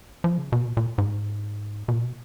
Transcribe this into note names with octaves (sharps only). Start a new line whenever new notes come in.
F3
C#3
B2
A#2
A#2
G#2
B2
A#2
B2